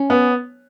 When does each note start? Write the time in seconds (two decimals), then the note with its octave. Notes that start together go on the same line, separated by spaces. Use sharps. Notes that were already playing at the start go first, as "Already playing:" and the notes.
Already playing: C#4
0.10 B3